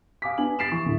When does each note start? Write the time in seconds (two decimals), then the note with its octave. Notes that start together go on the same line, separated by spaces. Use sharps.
0.22 F5 G#5 D6 D#6 B6
0.38 B3 D4 G#5 F#7
0.59 A6 B6 C7 D7 E7
0.72 E3 C#6
0.85 D1 D3 E4